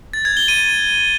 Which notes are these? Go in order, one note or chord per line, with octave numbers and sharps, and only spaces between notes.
A6
G#6
G7
D#7